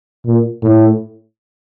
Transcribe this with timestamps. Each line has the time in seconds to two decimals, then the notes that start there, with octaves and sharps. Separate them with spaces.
0.26 A#2
0.63 A2